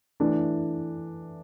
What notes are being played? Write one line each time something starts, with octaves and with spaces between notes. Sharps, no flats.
E3 A3 D4